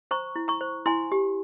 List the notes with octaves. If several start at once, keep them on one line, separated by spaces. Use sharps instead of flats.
C5 A#5 C#6
E4
A#5 C#6
C5
E4 G#5 C6
G4